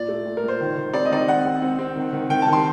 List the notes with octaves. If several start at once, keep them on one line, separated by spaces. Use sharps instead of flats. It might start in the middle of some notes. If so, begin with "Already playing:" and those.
Already playing: A#2 D5
A3
A#2
A#4
A#2 C5
D#3
D#3
C4 D5
D#5
D#3 D5 D#5
C4 F#5
C4
C4
C4
D#3
D#3
D#3 G5
A5
D#3 C6